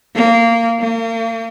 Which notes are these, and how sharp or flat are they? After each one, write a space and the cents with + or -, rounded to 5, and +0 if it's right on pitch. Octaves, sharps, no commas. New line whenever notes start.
A#3 -15
A#3 -40